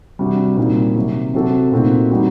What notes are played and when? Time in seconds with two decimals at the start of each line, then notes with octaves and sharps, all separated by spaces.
0.19 C3 G3 D4 F#4
0.57 A#2 G3 C4 D#4
0.95 C3 D#3 F#3
1.34 C3 F#3 C4 F#4 A4
1.72 A#2 A3 C4 D#4 F#4
2.10 G3 C4 D#4 F#4